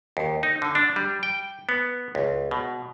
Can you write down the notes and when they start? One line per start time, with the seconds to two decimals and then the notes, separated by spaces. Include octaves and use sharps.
0.17 D#2
0.43 D#4
0.62 D3
0.75 D4
0.96 G3
1.23 G5
1.69 B3
2.15 C#2
2.51 B2